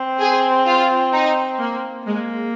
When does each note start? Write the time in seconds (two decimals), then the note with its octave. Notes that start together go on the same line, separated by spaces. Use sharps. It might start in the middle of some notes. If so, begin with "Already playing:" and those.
Already playing: C4
0.19 G#4
0.66 F4
1.13 D#4
1.60 A#3
2.06 G#3 A#3